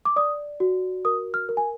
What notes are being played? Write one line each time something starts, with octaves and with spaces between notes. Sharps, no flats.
D6
D5 D#6
F#4
A#4 D#6
F6
A#4
G#5